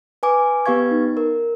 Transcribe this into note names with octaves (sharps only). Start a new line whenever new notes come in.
B4 G#5 D6
B3 G4 B4 F5 C#6 G#6
D#4
A#4